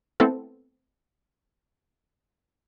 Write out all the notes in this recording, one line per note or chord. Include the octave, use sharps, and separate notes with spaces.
A3 B3 C4 E4 A4